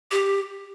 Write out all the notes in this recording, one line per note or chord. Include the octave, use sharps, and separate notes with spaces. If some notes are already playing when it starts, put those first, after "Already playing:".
G4